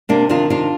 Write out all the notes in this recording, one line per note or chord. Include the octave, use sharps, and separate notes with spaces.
C3 A#3 D4
D#3 D4 F4
C3 D4 F4